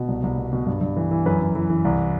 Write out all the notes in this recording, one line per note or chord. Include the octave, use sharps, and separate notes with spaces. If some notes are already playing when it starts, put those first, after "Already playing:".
Already playing: B2
C2
C2
B2
B2
G2
G2
E3
E3
F#2 B4
F#2
E3
E3
C2